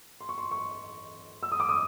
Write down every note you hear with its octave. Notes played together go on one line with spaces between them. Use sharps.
C6
C#6
C6
C#6
E6
D#6
D6
D#6